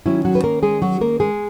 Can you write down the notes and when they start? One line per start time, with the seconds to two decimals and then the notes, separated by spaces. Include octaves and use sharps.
0.06 D#3 F#3 C#4 E4
0.25 F#3 F#4
0.35 B4
0.44 A#3 A#4
0.63 G#3 G#4
0.82 F#3 F#4
1.01 A#3 A#4
1.20 G#3 G#4